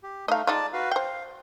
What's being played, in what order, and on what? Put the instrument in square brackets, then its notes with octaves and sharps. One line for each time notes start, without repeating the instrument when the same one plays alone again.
[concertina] G4
[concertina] A3 D#4 [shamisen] D#5 F5
[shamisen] G#3 D#4 F4 [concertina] D5 A5
[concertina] F#4 B4 F5
[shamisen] C5 G5 [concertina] F5